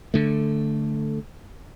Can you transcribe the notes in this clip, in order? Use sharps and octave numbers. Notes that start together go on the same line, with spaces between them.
D3 A3